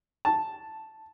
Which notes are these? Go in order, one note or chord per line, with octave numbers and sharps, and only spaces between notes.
A5